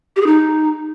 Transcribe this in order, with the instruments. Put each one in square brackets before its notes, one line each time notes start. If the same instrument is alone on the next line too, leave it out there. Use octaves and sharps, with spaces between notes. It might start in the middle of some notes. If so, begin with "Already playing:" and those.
[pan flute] G4
G#4
D#4